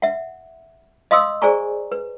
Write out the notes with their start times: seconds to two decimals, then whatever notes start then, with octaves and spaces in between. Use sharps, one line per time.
0.02 E5 F#5
1.11 D#5 F5 C6 D#6 E6
1.42 G#4 C5 D5 G#5 A#5 C#6
1.92 B4